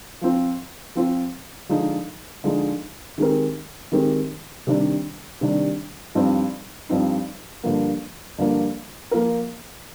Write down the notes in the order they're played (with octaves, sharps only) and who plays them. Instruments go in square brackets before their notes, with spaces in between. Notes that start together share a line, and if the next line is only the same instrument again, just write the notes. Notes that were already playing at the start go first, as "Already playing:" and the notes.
[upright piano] F3 C4 F4
F3 C4 F4
D3 F3 G#3 D#4
D3 F3 G#3 D#4
D#3 G#3 C4 G4 A#4
D#3 G#3 C4 G4 A#4
C3 D#3 G3 D4
C3 D#3 G3 D4
G2 F3 C4 D#4
G2 F3 C4 D#4
G2 D3 F3 A#3
G2 D3 F3 A#3
F3 A#3 F4 A#4